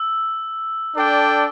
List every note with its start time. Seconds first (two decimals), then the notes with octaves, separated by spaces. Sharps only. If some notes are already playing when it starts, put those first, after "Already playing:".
Already playing: E6
0.95 D4 A4 D5 G5